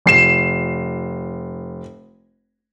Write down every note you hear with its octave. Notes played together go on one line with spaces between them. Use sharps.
F1 C7 E7